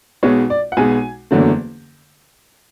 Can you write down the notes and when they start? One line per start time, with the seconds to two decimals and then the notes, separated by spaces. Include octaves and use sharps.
0.23 B1 B2 G#3 C#5
0.50 D5
0.72 F#5
0.77 B1 B2 G#3 G#5
1.31 F#1 E2 D3 F#3 A3